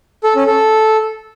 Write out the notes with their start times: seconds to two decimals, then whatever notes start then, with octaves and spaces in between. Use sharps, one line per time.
0.24 A4
0.35 C#4
0.47 A4